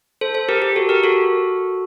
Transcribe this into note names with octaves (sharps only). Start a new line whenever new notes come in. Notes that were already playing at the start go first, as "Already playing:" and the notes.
A4 C5
A4 C5
G4 A#4
G4
F#4 A4
G4 A#4
F#4 A4